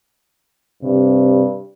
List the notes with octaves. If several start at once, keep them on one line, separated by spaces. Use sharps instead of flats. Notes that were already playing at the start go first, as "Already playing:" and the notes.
G2 C3